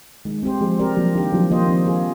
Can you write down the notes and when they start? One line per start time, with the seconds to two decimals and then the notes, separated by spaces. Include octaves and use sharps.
0.25 D#3 G#3
0.43 G3 C4 G4 C5
0.61 F3 G#3
0.79 G3 C4 G4 A#4 D5
0.97 F3 A#3
1.14 D#3 D4 G4
1.32 D#3 F3
1.51 A#3 F4 C5 D#5
1.68 C4
1.86 F4 G#4